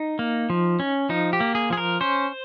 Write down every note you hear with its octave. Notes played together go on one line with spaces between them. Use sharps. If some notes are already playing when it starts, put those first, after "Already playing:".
Already playing: D#4
A#3
F3
C#4
F3 D#4
G4
A#3
G#4
F3 G#4
A#4
C#4 C5